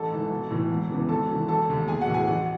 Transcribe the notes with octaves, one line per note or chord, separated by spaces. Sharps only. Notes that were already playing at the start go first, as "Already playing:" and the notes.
Already playing: A1 A4 A5
G#2 E3
B1
A2 E3
E1
E2 C#3 E3
G#1 A4 A5
F#2 E3
E1 A4 A5
D#2 D#3
B1 G#4 G#5
F#4 F#5
A2 E3
G#4 G#5
A1 F#4 F#5